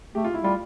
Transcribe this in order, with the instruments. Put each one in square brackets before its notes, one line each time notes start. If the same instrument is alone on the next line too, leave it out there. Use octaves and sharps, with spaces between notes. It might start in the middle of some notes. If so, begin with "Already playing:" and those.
[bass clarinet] A3 [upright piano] G4
[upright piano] F4
E4
[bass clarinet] G3 [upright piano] F4